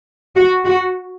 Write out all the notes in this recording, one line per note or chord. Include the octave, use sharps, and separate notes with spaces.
F#4
F#4